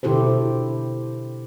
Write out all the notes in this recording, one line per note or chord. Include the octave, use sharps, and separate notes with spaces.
B2 D3 E4 G4 A4 C5